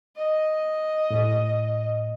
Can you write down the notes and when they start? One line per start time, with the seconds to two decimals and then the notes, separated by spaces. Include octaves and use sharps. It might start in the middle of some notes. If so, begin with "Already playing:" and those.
0.17 D#5
1.10 A2